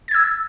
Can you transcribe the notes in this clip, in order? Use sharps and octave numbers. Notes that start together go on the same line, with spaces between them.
E6 G#6 A6